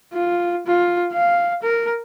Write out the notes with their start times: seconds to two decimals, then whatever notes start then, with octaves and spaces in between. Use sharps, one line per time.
0.13 F4
0.67 F4
1.13 F5
1.63 A#4